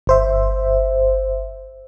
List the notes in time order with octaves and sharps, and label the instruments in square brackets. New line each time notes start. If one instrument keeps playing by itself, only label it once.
[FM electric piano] G1 C5 E5